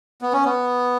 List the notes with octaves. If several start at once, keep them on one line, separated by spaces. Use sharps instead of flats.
B3
C#4
B3